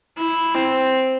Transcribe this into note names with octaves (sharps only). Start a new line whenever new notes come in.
E4
C4